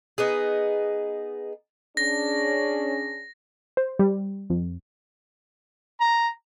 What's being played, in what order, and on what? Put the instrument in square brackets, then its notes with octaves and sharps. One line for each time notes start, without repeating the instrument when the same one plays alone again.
[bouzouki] B3 D#4 G#4
[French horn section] C#4 D4 G#4 [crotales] A#6
[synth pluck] C5
G3
F2
[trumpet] A#5